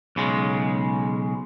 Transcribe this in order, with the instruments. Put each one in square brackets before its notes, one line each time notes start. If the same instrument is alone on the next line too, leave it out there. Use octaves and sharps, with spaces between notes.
[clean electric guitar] B1 C#3 G#3